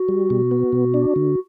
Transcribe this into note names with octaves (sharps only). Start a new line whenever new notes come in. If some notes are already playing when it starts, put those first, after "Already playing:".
Already playing: F#4
G3
B2
B3
B2
D4
D3